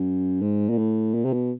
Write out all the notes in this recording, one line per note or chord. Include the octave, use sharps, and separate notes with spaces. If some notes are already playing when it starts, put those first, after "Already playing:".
Already playing: F#2
G#2
A#2
A2
A#2
C3
B2